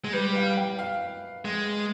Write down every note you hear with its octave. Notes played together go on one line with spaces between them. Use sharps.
G#3
G3 B4
F5
G5
F5
G#3